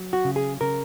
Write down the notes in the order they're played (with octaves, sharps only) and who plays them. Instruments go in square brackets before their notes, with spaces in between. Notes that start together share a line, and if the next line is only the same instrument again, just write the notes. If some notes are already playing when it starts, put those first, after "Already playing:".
Already playing: [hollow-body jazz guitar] F#3
F#4
C#3
G#4
C#3 A#4